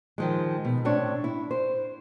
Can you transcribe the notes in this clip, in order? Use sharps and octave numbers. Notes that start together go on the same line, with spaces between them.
D#3 F3 G#3
B2
A2 C4 D4 C#5
E4
C5